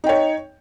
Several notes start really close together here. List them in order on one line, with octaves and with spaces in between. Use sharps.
D#4 G5 C#5